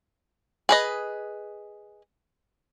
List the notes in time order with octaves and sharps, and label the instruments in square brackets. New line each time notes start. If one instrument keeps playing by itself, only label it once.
[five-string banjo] G#4 B4 D#5